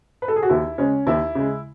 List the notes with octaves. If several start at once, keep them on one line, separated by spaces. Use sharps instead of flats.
B4
A4
G#4
F#4
D#2 E4
C#3 G#3 C#4
D#2 E4
C#3 G#3